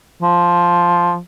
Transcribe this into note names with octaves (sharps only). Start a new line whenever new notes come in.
F3